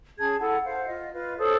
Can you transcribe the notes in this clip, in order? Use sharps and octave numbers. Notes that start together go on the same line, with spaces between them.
C#4 G#4 A5 G#6
E4 A4 F#5
C5 F5 F#5
F4 D#5
F4 B4
A4 C5 C#5 D#6